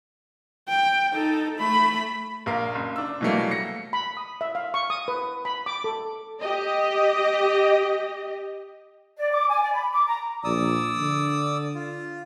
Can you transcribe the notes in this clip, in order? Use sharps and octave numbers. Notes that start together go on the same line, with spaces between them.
G5
D#4 A4
A3 B5
A#1 A#4 F5
F#1
D4 E6
B2 E3 F#3 G3 A3 A#3
A#6 C#7
B5
D#6
E5
F5
C#6
D#6
B4
B5
D6
A4
G4 D#5
D5
D6
G#5
D5
B5
D6
A#5
A#1 D5 D#6 E6
D3
F4